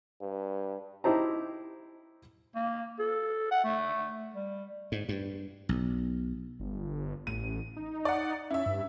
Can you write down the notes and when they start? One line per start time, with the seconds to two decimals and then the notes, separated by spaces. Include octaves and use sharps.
0.21 G2
1.04 D#4 E4 G4 C5 A5 A#5
2.55 A#3
2.99 A4
3.51 F#5
3.64 A3
4.34 G3
4.92 G#2
5.09 G2
5.69 B1
6.59 G1
7.27 A1 D#7
7.77 D#4
8.05 D5 F#5
8.50 C#4 E4 E5
8.66 G2